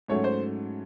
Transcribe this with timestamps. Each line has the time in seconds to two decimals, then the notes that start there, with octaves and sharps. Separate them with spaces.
0.08 G#2 F#3 A3 C#4 F#4 C#5
0.24 C5